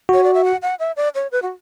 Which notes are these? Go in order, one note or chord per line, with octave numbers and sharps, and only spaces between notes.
F#4 C#5
D5
E5
F#5
F#5
E5
D5
C#5
B4
F#4